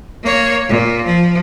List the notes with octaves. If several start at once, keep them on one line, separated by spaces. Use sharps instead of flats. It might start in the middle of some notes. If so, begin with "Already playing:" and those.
A#3 C#5
A#2
F3